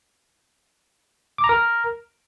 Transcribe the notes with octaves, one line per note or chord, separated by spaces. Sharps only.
D6
A#5
A#4